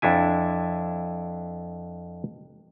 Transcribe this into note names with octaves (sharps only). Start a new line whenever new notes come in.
F2 D4 E4 G#5